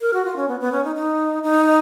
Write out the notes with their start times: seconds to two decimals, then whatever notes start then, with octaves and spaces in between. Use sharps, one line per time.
0.01 A#4
0.13 F#4
0.25 F4
0.36 C#4
0.48 B3
0.60 B3
0.72 C#4
0.84 D#4
0.96 D#4
1.43 D#4